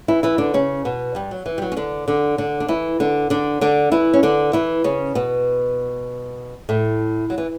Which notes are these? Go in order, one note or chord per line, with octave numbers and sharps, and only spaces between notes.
E3 E4
E3 E4
D3 D4
C#3 C#4
B2 B3
G2 G3
F#3
E3
G3
F#3
C#4
D3 D4
D3 D4
D3 D4
D4
E3 E4
D3 D4
D3 D4
D3 D4
E3 E4
C#4
D3 D4
E3 E4
C#3 C#4
B2 B3
A2 A3
F#3
E3